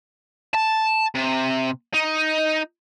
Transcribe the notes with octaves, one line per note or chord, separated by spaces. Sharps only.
A5
C3
D#4